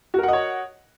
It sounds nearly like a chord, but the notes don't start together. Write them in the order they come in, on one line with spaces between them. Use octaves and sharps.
F#4 A#4 F#5 D#5 C#5